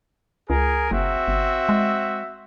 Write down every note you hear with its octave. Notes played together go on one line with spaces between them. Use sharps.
C#2 G#4 A#4 G#5
F#1 C4 F#4 E5
G1
G#3